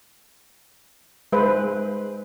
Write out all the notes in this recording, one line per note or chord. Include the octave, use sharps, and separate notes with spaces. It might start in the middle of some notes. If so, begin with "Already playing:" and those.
G#3 B4 C5